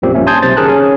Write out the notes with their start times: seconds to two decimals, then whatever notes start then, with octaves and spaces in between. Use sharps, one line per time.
0.02 A#1 F#2 A#2 C4 G4
0.14 A#1 G2 A#3 C#4 E5
0.27 G#5 A5 C6 D#6 G6 G#6
0.43 B1 C3 C5 A6
0.57 D#3 C#4 G#4 A#4 A5 F#6
0.68 C#4 G#4